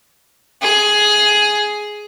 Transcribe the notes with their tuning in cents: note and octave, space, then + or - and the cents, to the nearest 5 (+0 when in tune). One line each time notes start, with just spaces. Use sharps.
G#4 +10